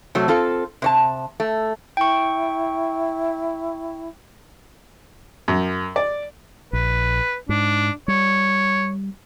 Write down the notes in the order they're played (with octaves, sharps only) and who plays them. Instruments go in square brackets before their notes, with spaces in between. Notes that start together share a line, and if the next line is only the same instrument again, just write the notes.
[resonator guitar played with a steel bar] C3 F#3 A3
C4 F4 A4
C3 C#5 A5
A3
[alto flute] E4 [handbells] G5 C#6
[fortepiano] F#2
D5
[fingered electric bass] A#1 [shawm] B4
[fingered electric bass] G#2 [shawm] D4
[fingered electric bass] G3 [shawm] C#5